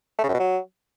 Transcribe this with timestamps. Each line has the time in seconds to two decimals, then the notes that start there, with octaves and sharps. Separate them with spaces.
0.19 A3
0.24 C#3
0.29 F#2
0.34 B2
0.40 F#3